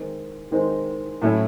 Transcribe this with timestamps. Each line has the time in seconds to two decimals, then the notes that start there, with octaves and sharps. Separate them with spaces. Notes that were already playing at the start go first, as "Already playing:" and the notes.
Already playing: D#3 G#3 C4 D#4
0.51 D#3 G#3 C4 D#4
1.22 A2 F#3 A3 C#4 E4